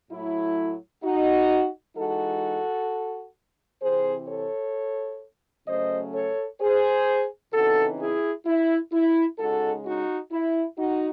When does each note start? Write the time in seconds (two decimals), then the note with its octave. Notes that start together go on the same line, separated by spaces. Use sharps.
0.10 A2 F#3 A3 E4
1.03 D#4 F#4
1.96 E3 G#3 D#4 F#4 A4
3.82 C3 E3 C4 G#4 C5
4.28 A4 C#5
5.67 C#3 F#3 A3 C#4 C5 D#5
6.13 A4 C#5
6.60 G#4 C5
7.53 C#3 E3 C4 D#4 F#4 A4
7.99 E4 G#4
8.46 E4
8.92 E4
9.38 C#3 G#3 D#4 F#4 A4
9.85 D#4 F#4
10.31 E4
10.78 D#4 F#4